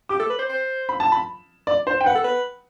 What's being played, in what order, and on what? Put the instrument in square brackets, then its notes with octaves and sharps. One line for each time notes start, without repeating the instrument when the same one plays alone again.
[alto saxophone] G4 [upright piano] D6
[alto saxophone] A4
B4
C5
C5
[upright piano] B5
A5
B5
D5
C5
G5
[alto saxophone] B4 [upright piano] F#5
[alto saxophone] A4
B4